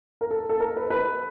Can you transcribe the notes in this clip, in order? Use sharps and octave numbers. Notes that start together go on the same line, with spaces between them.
A#4
A4
A4
A#4
B4
B4